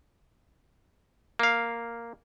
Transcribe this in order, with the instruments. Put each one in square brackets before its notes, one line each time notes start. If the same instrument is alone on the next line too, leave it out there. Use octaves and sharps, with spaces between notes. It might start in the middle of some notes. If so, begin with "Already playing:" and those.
[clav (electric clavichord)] A#3 F5